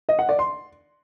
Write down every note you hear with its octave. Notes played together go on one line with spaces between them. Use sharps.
D#5
F#5
D5
C6